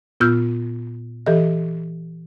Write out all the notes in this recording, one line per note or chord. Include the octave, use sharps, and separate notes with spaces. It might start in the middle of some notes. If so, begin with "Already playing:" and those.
A#2 B3 F4 E6 F6 G6
E3 G4 A4 D#5